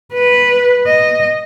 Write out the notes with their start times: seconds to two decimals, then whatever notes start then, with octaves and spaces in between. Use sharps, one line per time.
0.13 B4
0.87 D#5